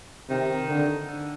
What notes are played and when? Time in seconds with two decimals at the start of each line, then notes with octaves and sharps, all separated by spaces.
0.29 C3 D#3
0.68 D3
1.07 D3